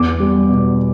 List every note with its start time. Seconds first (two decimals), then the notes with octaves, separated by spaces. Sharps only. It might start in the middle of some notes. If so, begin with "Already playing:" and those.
Already playing: E2 D6
0.20 G3
0.49 B2